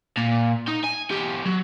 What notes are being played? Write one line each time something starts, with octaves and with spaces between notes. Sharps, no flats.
A#2
D#4
G#5
E2 G4
F#3